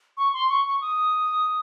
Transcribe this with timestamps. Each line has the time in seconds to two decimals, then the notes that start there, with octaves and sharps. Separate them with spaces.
0.17 C#6
0.33 C6
0.49 C#6
0.65 C#6
0.81 D#6